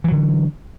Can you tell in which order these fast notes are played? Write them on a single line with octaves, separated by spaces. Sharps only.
E3 F#3 D3